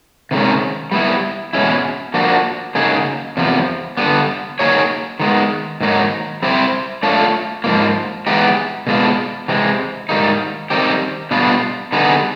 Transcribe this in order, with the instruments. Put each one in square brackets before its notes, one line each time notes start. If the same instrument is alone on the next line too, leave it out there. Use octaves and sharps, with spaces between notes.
[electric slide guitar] C3 D#3 G#3 C#4
G3 B3 E4
E2 B2 G#3 C#4 E4
F3 A#3 D4 F#4
C#3 F#3 A#3 D#4 G#4
E2 C3 F3
D3 G3 B3
F#3 A#3 D#4 G#4 C#5
D#3 G#3 B3
G#2 D#3 F#3 A#3 D#4
G3 C4 E4 G4 C5
A3 D4 F4 A4 C#5
G#2 F3 A#3
E3 G#3 B3 D#4 G4
B2 G#3 B3 D4 F4
C3 E3 G#3 C4
G#2 D#3 G3 A#3 D#4
D#3 G3 C4 D#4 G4
B2 G3 B3 D4 F4
D3 G3 B3 D#4 G#4